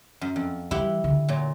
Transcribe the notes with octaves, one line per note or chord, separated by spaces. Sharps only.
F#2
F2
E3 G3 E4 G4 F#5
D3
A#2 F#3